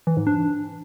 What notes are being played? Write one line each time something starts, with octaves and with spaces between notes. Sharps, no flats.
E3
G#2
D4